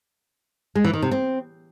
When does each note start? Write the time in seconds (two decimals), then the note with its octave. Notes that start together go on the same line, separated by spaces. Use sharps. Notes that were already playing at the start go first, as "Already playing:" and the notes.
0.75 G#3
0.84 E3
0.93 D#3
1.02 C3
1.11 C4